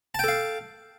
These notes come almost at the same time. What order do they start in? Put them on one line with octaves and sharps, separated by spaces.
A5 G5 A4 F5